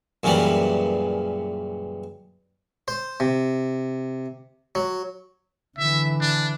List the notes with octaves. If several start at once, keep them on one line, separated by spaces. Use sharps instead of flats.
F#2 A#2 C#3 E3 G3
C5
C3
F#3
D3 E3 E5
D4